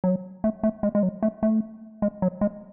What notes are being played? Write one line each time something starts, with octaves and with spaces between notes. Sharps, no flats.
F#3
A3
A3
G#3
G#3
F#3
A3
A3
G#3
F#3
G#3